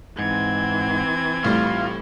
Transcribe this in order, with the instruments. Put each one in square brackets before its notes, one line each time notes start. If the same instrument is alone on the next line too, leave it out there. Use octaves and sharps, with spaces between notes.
[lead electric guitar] G#2 [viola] E3 C4 [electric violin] G#6
[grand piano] A2 G3 [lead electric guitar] F4